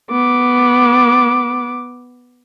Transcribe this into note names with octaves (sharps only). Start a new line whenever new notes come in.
B3 D6